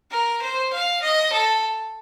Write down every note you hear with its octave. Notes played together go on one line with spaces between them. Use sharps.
A#4
C5
F5
D#5
A4